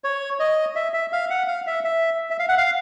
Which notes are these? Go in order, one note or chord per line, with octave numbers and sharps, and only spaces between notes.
C#5
D#5
E5
E5
F5
F#5
F5
E5
E5
E5
F5
F#5
F5